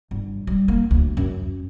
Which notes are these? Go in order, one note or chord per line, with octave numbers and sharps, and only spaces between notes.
G1
G3
A#3
D2
F#2